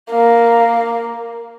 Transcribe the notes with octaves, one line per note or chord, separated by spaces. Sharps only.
A#3